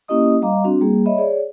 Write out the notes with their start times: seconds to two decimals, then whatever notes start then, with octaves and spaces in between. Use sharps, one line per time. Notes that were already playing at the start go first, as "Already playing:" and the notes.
0.08 A#3 C#4 E4 G4 D#5 D#6
0.42 G3 D#5 F5 A#5 D6
0.64 C4 D4 F#4
0.81 G3 A#3 G#4
1.05 C#5 D#5 E5 B5
1.18 G#4 C#5 D5